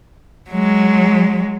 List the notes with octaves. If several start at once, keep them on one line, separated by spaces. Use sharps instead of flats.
F#3 G#3